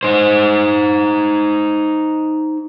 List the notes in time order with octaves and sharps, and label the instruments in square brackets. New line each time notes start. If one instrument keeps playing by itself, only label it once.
[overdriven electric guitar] D#4 C5